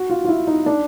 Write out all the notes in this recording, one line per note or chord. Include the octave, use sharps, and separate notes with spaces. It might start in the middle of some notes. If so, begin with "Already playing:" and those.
Already playing: F#4
F4
F4
E4
D#4
D4